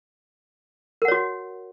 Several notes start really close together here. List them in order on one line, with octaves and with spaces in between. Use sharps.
A#4 F#5 C#5 F#4